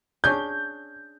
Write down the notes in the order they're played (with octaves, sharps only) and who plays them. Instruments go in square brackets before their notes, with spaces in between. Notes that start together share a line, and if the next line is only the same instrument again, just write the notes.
[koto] C#4 D4 G#4 [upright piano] G6